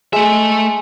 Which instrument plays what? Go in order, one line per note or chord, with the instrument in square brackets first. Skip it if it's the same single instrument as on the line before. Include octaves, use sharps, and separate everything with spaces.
[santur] G#3 [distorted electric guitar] A3 E5